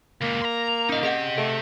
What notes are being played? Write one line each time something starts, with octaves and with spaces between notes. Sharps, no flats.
C#2 A#2 A#3
A#5 C6
C#4 D#4 F4 D#5
C4 G4 G#4 D#5 F#5
A3 G#4